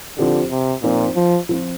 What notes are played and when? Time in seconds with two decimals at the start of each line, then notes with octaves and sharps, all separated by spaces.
0.18 D3 F3 C4 G4
0.51 C3
0.83 A#2 F3 C4 D#4
1.16 F3
1.49 F3 C4 F4